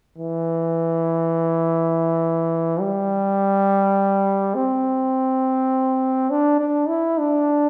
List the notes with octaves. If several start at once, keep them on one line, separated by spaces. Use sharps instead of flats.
E3
G3
C4
D4
D4
E4
D4